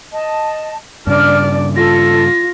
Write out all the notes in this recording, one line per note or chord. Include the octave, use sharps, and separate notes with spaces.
D#5 A5
G2 C#3 D4 D5 F6
F4 A4 A#6